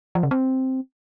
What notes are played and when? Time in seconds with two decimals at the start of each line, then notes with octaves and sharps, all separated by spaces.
0.15 F3
0.23 C#3
0.31 C4